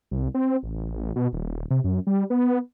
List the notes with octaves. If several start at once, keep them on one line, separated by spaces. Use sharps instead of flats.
C2
C4
A1
B2
D#1
C3
F#2
G3
B3